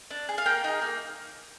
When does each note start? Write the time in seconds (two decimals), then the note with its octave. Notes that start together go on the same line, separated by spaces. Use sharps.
0.10 D4
0.29 G#4
0.38 F5
0.46 A#3 G5
0.64 D#4 G#4
0.82 A#3